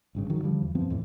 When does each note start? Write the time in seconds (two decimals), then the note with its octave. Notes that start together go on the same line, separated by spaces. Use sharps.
0.15 G#1 G2 C#3
0.30 D#3 F#3
0.43 D3 F3 G3
0.62 E2
0.75 F#2 F3 B3 C4
0.90 F2 A2 E3